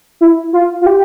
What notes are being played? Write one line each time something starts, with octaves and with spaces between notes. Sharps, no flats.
E4
F4
F4
G4